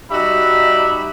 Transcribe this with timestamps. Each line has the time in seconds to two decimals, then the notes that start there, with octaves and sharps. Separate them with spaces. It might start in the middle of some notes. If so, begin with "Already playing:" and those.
0.11 G3 D#4 F#4 G4 E5 B5